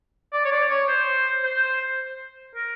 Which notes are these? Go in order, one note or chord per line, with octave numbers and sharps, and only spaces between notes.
D5
C#5
D5
C#5
C5
C5
A#4